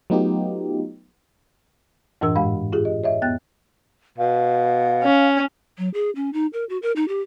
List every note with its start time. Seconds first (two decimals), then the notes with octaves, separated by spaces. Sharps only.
0.10 F#3 A3 B3 D#4 F4 G4
2.21 F#2 A2 E3 D4 A#4 E6
2.35 G#2 G#3 F5 B5
2.72 F4 G4 G#4
2.85 D#5
3.04 C#5 D#5 E5
3.22 F2 B3 G5 F#6 A6
4.18 B2 F5
5.03 C#4
5.78 F#3
5.94 G#4
6.16 C#4
6.33 D#4
6.53 A#4
6.69 F#4
6.82 A#4
6.96 D#4
7.08 G4